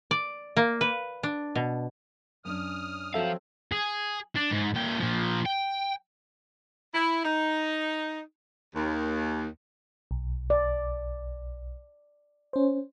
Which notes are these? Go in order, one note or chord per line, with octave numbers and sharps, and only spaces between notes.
D5
A#3
B4
D4
B2
F#2 C#4 D4 D#6 F6
F3 F#3 C4 A4 E5 F5
G#4
D4
G#2
A#2 G5
A#2 F3
G5
E4
D#4
D#2
B1
D5
C#4 C5